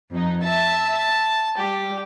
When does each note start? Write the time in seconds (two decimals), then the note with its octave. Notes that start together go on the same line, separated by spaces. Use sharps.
0.11 F2 D#4
0.43 E5 A5
0.97 A5
1.58 G3 G4